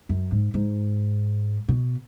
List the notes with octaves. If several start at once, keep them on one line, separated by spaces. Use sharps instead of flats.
F#2
G#2
G#2
B2